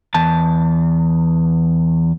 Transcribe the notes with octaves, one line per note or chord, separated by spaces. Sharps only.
E2 A5